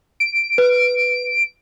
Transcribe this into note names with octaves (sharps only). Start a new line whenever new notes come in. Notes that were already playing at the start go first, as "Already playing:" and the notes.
D7
B4